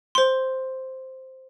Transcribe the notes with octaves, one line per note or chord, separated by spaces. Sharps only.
C5 C6